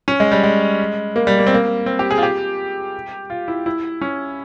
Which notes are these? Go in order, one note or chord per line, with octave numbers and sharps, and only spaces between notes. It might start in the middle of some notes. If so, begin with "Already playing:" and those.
C#4
G#3
G3
G#3
A#3
G3
A#3
C4
A#3
C4
G4
G#4
F4
G4
F4
E4
E4
C#4